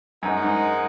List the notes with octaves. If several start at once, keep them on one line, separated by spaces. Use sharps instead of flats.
F#2 G#3 D#4 A#4 D#5 F#5
G#2